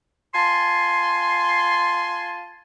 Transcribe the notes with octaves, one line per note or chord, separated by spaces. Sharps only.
F4 G#5 A5 C6